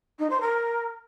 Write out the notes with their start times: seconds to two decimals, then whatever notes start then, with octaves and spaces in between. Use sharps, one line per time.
0.19 D#4
0.30 C5
0.41 A#4